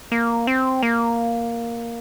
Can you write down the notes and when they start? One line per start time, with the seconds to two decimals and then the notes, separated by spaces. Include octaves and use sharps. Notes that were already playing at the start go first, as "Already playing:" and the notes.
0.12 A#3
0.47 C4
0.83 A#3